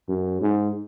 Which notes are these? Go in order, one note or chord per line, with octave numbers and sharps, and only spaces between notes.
F#2
G#2